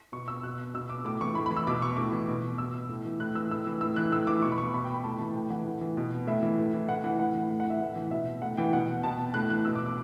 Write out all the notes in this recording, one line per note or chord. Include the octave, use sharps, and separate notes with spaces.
B2 C#6
E6
B2 F#6
B2 E6
D6
A2 D6
E3 C#6
A2 B5
B5
E3
E6
B2 D6
C#6
A2 D6
E3
B2
B2 E6
A2
E3
A2 F#6
E3 E6
A2 E6
E3
A2 E6
E3 F#6
A2 E6
E3 D6
B2 C#6
B5
C#6
B2 B5
G5
B5
A2 A5
E3
A2 G5
E3 F#5
A2
E3
B2
A2 E5
E3
A2
E3
A2 F#5
E3 F#5
A2 F#5
E3
A2
F#5
E3
E5
A2
E3
B2 E5
A2 F#5
E3 G5
B2 F#5
B2 A5
A2 F#6
E3 F#6
B2 E6
D6
D6